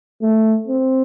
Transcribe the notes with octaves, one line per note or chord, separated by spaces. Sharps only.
A3
C4